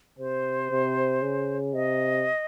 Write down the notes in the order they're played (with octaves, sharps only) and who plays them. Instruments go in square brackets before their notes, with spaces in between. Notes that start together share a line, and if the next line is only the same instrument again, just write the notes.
[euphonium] C3 [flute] C5
[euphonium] C3
C#3
[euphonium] C3 [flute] D#5